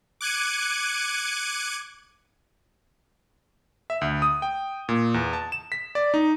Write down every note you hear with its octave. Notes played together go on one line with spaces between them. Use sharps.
D6 F#6 G#6 C#7 D#7
E5
D2
D#6
G5
A#2
E2
A5
E7
B6
D5
D#4